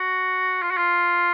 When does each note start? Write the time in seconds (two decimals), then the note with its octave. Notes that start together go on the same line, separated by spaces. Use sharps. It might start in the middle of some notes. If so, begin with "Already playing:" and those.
Already playing: F#4
0.62 F4
0.71 F#4
0.77 F4